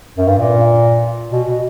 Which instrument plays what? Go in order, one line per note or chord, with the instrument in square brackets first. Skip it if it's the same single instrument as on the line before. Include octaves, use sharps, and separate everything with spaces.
[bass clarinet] F#2
G2
A#2
B2
B2